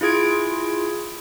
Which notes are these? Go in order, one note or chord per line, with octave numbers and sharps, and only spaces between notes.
E4 F4 G#4 G#6 D7